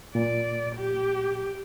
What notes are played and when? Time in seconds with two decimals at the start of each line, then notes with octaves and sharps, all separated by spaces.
0.15 A#2 D5
0.76 G4